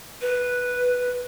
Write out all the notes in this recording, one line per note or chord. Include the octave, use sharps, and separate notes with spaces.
B4